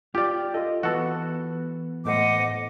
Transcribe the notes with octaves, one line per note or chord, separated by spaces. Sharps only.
F4 G4 D5
F4 A4 D#5
E3 B3 F#4 A4
A2 A3 C5 D#5 F#5 D6